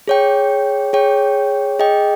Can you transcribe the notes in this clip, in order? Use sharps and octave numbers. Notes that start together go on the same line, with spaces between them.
G#4 C#5 G5
G#4 C#5 G5
G#4 D#5 G5